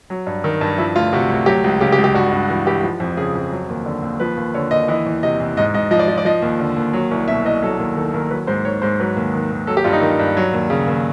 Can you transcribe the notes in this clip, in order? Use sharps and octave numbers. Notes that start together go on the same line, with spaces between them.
F#3
G2
D#3
G2
F3 E4
D2 F4
C3 F#4
D2
F#3 G4
C#2
C#3 G4
G4
C#2
G4
G2 F#4
G2
E3 F#4
E3 G4
F3
F2
C#3 G#4
F2
F#3
D#2
D3
D#2
F3 B4
D#2
D3 C#5
D#2 D#5
E3 D#5
E2
C3 D#5
E2
G#2 D#5
G#2 D#5
F3 D#5
D5
F3 D#5
D5
F3 D#5
D#2
D3
D#2
F#3
C2
B2 E5
C2 D#5
F#3 A4
D#2
D#3 A4
D#2 A#4
F#3 B4
G#2 C5
D#3 C#5
G#2 C5
F#3 B4
D#2
D#3
D#2
F#3 A4
G4
G2 F4
D#4
D#3
G2
F#3
D#2
C#3
D#2